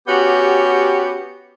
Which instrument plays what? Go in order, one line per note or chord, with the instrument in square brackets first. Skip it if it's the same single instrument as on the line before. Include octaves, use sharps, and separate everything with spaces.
[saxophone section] B3 C#4 F#4 G4